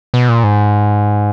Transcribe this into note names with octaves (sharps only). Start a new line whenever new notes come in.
B2
A#2
G#2